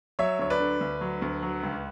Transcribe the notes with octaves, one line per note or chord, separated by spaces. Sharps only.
F#3 C#5 E5
D2 C#5
B4 D5
D3
D2
F#3
D2
F#3
C#2